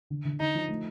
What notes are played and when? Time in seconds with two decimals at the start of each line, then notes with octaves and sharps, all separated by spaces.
0.10 D3
0.25 D3
0.40 D3 D#4
0.55 F3
0.69 A3